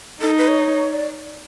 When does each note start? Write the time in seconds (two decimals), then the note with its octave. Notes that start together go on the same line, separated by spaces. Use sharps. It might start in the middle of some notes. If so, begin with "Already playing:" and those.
0.21 D#4 A4
0.38 B4
0.48 C#5
0.93 D5